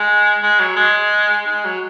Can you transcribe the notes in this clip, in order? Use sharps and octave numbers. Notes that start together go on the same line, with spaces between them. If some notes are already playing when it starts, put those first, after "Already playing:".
Already playing: G#3
G#3
F#3
G#3
G#3
F#3